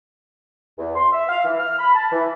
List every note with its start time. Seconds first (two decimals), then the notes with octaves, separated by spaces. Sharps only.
0.78 E2
0.96 C6
1.12 E5
1.29 F5
1.45 E3
1.60 F6
1.78 B5
1.95 A5
2.12 E3